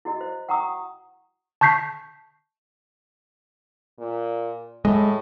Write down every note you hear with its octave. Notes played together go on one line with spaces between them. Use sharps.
E4 F#4 D#5
C5
F#5 G5 A#5 C#6 D#6
A5 C#6 G6 B6 C7
A#2
A2 G#3